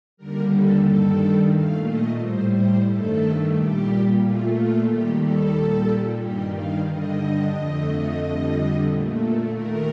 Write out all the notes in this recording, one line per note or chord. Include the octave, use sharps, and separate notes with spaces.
D#2 D3 G3 A#4
A4
G2 D#3 G3 A4
A#2 A3 F5
D#5
A2 G3 C5
C5
G2 D#3 A3 A4
A#2 G3 G4
A#2 A3 F4
F4
D#2 D#3 G3 G4
A4
A#2 G3
G2 D#3 G3 G4
F5
G2 D3 G3 D#5
F2 D3 A3
F2 D3 G3
A#2 A3
D#2 D#3 A3 A#4